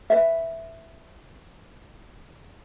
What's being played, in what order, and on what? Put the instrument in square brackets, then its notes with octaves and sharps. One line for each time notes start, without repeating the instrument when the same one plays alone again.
[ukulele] B4 E5